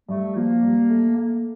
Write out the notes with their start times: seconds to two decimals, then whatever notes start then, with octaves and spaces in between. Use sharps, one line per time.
0.09 G2 A3
0.35 F3 A#3
0.63 G2
0.89 A3
1.16 A3 A#3